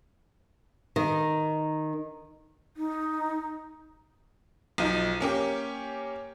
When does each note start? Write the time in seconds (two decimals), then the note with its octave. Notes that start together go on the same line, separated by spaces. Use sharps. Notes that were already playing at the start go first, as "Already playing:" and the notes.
0.96 D#3
2.77 D#4
4.78 B1 F3 D#4
5.20 A#3 C#4 G4